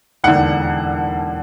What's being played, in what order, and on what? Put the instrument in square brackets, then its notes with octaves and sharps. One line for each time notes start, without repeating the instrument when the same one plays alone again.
[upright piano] E1 D#2 D3 F#5